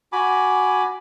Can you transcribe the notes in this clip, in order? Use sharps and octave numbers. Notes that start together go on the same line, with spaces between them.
F#4 G#5 B5 D6